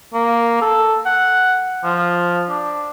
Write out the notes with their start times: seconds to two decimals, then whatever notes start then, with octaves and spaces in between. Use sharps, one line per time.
0.14 A#3
0.62 A4
1.06 F#5
1.84 F3
2.49 D4